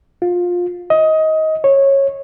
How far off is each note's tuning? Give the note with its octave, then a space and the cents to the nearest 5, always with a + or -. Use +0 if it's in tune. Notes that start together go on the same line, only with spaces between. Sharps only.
F4 +20
D#5 +20
C#5 -15